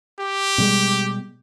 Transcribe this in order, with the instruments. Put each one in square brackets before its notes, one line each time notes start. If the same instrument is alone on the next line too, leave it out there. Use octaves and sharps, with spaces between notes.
[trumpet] G4
[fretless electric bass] B2 G3 G#3